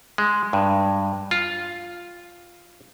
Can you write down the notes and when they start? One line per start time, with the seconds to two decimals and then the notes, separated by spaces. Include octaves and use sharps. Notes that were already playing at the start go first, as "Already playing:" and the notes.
0.18 G#3
0.53 G2
1.31 F4